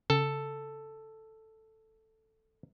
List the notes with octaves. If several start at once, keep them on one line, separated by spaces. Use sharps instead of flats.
C#3 A4